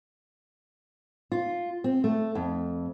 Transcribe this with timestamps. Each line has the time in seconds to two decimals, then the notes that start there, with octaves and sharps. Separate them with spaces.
1.32 F4
1.84 C4
2.04 A3
2.35 F2